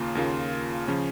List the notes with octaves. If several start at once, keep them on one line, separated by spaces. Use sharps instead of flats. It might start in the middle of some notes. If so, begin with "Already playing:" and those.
Already playing: D#2 C#3 A#3 F4
D#2 C#3 A#3 F4
C#3 F3 C#4